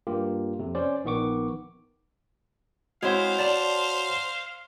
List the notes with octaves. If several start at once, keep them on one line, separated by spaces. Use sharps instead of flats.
G2 A#3 F4 G4
F2 C3
C#4 C5 D5
A#1 D#3 B3 C#6 D6
G#3 C4 E4 F#4 C5 C#5 F5 F#5
D5 A5